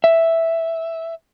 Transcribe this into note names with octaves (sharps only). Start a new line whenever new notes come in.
E5